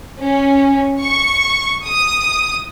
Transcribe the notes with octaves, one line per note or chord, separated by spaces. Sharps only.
C#4
C#6
D#6